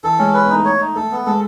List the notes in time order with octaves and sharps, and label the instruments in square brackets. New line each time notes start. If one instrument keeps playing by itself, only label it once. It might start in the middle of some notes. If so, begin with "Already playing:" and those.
[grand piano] E3 [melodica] A4
[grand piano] G#3 [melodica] C#4
[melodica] B4
[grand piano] B3
[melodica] D#4
[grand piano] A3
[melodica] C#5
D#4
[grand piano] A3 [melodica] A4
[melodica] B3
[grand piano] G#3 [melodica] A4